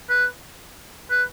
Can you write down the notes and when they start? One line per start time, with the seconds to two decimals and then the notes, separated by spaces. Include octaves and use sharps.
0.09 B4
1.10 B4